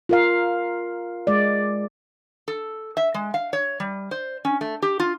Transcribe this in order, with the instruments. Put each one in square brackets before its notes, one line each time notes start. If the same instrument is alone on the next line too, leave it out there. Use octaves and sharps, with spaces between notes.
[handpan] F4 A#4 F5
G#3 D5
[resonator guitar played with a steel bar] A4
E5
G#3
F5
C#5
G3
C5
C#4
A3
G4
F4